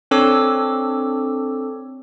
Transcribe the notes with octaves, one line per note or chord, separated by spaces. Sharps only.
C4 D4 A4 C#5 D6 E6